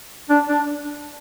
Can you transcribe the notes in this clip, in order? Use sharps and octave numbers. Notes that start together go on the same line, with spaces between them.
D4
D4